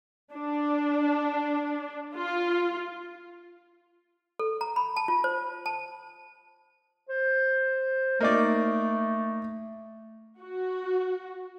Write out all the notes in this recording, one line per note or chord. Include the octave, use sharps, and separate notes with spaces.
D4
F4
A4
A#5
B5
A5
F4
C5
A5
C5
A3 A#3 D#4 D5
F#4